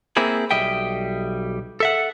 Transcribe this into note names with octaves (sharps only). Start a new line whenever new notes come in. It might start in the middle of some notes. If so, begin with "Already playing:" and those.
A#3 C4 E4 G#4
B1 G3 D#5 E5 G5
A4 E5 F#5